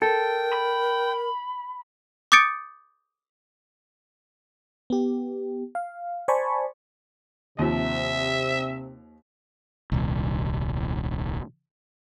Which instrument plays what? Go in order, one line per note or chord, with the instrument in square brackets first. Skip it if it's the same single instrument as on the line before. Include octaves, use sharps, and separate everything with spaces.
[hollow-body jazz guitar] A4 [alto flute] A#4 [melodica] G5
[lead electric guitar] B5
[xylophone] D6 D#6 G6 A6 C#7 D7
[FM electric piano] B3 G4
F5
C5 D5 G#5 A5 B5 C#6
[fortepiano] D#2 F3 [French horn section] C3 [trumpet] E5
[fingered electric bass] D#1 C2